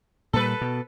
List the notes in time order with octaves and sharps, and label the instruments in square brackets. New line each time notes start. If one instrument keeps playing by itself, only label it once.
[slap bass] A#2 G3 [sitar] A4 B4
[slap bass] B2